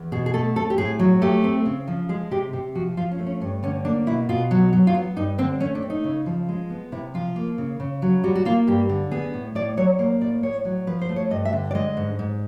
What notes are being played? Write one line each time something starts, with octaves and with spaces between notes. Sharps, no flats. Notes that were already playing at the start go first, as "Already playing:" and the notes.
Already playing: E2
B2 G#4
G#4
A3 A4
C4 A4
G4
A2 G#4
F#3
A3 G4
C4
C#3
F3
G#3 G#4
C3 G4
C3 G4
F3 F#4
F3 F4
C#4
A3
C#4
G2 C#4
D3 C#4
A#3 D4
B2 E4
B2 F4
F#3
F#3
F4
B3
G2 D#4
D3 C4
A3 C#4
D4
C4
D#4
C#3
F3
G#3
B3
C3 E4
F3 F4
A#3
C#3
C#3
F#3
G3 F#4
F#4
A#3 F4
G2 G4
D3
B3 G#4
A2
A2 D5
F#3 C#5
A#3 C5
A2 D5
A2 C#5
F#3
F3 B4
C5
A3
C#5
G2 D#5
E5
D3
D5
G#3 D#5
G#2
G#2